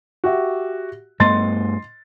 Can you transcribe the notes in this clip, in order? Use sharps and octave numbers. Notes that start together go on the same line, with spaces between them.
F#4 G4 E5
G2 A3 B3 D#5 C6 A6